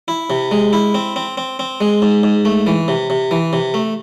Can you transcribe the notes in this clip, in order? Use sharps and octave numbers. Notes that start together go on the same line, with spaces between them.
E4
C3
G#3
E4
C4
C4
C4
C4
G#3
G#2
G#2
A3
E3
C3
C3
E3
C3
A3